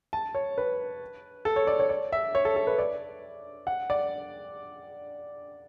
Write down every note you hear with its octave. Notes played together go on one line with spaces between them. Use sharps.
A5
C#5
B4
A4
C#5
D5
C#5
D5
E5
C#5
A4
A4
B4
D5
F#5
D5